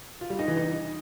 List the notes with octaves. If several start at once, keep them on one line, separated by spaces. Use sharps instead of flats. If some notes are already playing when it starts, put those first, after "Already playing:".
F4
G3
D#4
E3
D#4